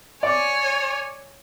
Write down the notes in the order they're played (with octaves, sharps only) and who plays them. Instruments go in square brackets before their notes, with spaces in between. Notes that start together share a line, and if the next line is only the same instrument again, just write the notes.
[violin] C#5 G#5 [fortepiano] D5 D6